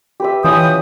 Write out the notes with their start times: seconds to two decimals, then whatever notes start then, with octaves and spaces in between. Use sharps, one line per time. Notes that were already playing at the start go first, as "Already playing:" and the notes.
0.20 G4 B4 E5
0.44 E3 C#4 E4 F4 D#5 G5 D#6